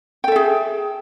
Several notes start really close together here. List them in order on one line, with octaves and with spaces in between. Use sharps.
G5 A4 E5 G#4